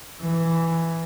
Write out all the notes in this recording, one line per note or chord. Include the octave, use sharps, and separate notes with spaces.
E3